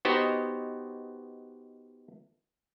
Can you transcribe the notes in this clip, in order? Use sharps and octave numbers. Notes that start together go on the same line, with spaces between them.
B3 D#4 F#4 G4 C5 D#5